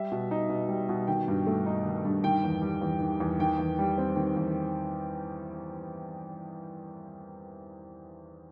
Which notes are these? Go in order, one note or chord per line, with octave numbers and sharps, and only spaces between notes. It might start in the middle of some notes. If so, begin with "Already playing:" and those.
Already playing: G3 E5
B2
D#4
B2
G3
B2
D#3 G5
G2
A3
D#4
D#3
G2
D#3 G5
E2
G3
E2
D#3
E2
D#3 G5
E2
G3
C4
D#3
E2